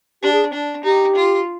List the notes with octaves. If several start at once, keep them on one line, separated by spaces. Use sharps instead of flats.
D4 G4
G#4
D4
D#4 G4
F4